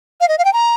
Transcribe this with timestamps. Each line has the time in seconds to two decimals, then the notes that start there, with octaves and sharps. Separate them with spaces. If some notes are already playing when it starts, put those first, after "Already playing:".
0.21 F5
0.28 D#5
0.38 F5
0.45 G5
0.53 A#5